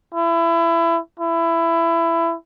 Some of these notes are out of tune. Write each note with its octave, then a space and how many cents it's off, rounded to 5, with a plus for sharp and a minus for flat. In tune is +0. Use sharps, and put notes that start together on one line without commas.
E4 +25
E4 +20